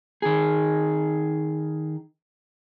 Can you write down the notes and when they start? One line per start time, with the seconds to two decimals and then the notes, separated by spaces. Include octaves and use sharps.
0.22 D#3 G#4